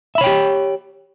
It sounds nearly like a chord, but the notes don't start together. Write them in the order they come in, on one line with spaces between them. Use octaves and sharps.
E5 B5 C#5 G5 G4